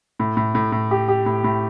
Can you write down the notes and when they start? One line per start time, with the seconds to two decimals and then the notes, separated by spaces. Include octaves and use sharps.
0.20 A2
0.37 A2
0.55 A2
0.72 A2
0.91 G4
1.08 G4
1.26 A2
1.44 A2